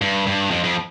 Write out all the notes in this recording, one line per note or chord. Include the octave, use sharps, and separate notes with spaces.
G2
G2
F2
F2